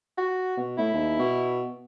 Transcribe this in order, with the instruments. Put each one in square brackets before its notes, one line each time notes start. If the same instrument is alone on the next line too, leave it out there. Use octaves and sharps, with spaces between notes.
[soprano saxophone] F#4
[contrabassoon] B2
[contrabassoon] A2 [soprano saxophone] E4
[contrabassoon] D#2
B2